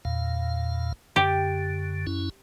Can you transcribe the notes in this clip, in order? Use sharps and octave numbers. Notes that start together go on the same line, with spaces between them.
E2 A#2 F5
F#2 D3 G4
F#2 C#4 E4